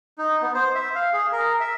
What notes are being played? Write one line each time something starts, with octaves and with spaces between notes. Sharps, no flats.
D#4
B3
C5
E5
F5
G#4
A#4
E5